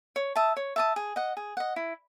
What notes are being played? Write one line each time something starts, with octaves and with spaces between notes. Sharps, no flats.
C#5
E5 A5 D#6
C#5
E5 A5 D#6
G#4
D#5 F#5
G#4
D#5 F#5
E4